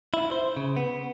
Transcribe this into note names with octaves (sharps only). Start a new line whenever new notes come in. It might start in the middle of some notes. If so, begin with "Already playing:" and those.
E4
C5
C#3
B3